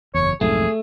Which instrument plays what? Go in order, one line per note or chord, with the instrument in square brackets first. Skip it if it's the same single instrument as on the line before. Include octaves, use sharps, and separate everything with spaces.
[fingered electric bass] F#1 E2 [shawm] C#5
[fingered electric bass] B1 F2 G#2 [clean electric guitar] A3 [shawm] G#4